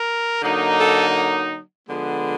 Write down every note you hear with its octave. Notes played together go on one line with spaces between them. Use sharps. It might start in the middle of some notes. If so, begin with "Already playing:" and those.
Already playing: A#4
D3 F#3 A#3 D#4
A4
D3 F3 G#3 B3